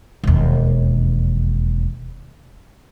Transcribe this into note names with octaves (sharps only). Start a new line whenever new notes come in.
E1 D#2